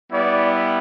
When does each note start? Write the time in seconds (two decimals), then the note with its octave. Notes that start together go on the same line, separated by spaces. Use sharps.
0.12 G3 B3 E4 D5